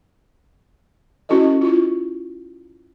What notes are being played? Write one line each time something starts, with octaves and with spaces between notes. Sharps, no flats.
C#4 E4 F#4 A4 D#5
E4 F4